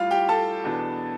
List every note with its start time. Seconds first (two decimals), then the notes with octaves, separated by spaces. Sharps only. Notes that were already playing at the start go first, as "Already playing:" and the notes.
Already playing: A2 G3 F4 F5
0.11 G4 G5
0.29 A4 A5
0.64 E2 B2 B3 D4